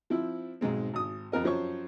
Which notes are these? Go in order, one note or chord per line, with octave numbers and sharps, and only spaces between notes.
F3 C4 E4
B1 G#2 G#3 C4
G#1 D#6
F2 C4 A#4 D#5
F#2 F3 C5 C#5 C#6